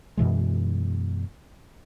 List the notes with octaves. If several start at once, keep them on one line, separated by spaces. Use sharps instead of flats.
F#2 B2 E3 G#3